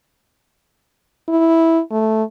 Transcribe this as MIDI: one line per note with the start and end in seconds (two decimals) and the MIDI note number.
1.28 1.80 64
1.91 2.23 57